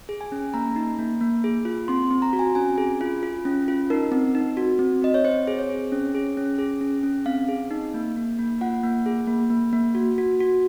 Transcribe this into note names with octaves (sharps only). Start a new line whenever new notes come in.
G#4
G#5
C#4
A#3 A#5
D#4
A#3
A#3
G#4
F4
C4 C6
C4
A#5
F#4
G#5
C#4 G#5
G#4
F4
F4
C#4
F4
D#4 A#4
C4
D#4
F#4
C4
C4 D#5
C#5
C4 C5
G#4
C#5
G#4
C#4
G#4
C#4
G#4
C#4
C#4
C4 F5
G#4
D#4
A#3
A#3
A#3
F4 F#5
A#3
G#4
A#3
A#3
A#3
F#4
F#4
F#4